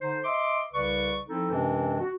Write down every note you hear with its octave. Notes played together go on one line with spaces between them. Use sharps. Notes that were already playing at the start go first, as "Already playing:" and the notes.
D3 D#4 C5
D#5 E5 C6 D6
C2 C#3 B4 D5 C#6
F3 C4 D#4 E4 A4
F#2 C3 E3 G#3 C4 D4
F#4